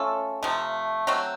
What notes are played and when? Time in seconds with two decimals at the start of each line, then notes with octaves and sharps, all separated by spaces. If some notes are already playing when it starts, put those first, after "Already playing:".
Already playing: A3 C#4 F4 A4
0.43 C3 F3 A3
1.07 F#3 A3 C4